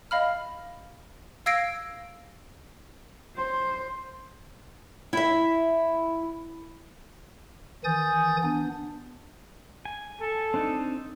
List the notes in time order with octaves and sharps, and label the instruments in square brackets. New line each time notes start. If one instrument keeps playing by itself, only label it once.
[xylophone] D#5 F5 B5 F6
F5 E6 G#6 A#6 C7 D7
[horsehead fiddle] C5
[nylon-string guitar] E4 E5
[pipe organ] D#3 E3 G#5 D#6 G6 A6
B3 D4
[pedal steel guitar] G#5
[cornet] A4
[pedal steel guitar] C4 D4 D#4